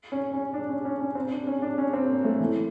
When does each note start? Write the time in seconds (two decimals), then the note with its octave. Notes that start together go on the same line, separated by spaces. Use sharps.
0.12 C#4
0.33 C#4
0.54 D4
0.69 C#4
0.85 C#4
1.00 C#4
1.15 C4
1.32 D4
1.47 C#4
1.62 D4
1.78 C#4
1.93 C4
2.09 A#3
2.25 A3
2.40 E3